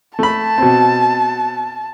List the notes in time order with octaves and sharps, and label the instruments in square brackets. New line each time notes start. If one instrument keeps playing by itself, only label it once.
[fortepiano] A3 B5 [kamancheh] A5
[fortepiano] B2 C4